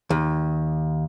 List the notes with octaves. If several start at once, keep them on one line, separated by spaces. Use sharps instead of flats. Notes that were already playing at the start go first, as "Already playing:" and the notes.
D#2